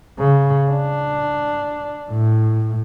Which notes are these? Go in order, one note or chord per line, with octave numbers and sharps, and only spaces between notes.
C#3
D4
A2